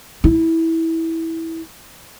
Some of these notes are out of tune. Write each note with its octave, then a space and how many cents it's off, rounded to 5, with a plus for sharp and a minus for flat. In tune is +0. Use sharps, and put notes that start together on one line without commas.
E4 -15